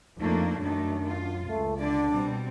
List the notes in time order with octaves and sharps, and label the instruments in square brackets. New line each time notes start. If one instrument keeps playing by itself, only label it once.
[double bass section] F2 [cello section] A3 A#3 D4 [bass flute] D#4
[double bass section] F#2 [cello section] D#3 A3 [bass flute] D4
[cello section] F4
[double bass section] C#2 [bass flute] A3
[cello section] D3 D5 [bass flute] D4
[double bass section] B2 [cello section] G3 C4